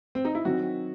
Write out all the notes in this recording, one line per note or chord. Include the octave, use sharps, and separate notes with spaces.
C4
D#4
E4
D#3 F#3 C4 F#4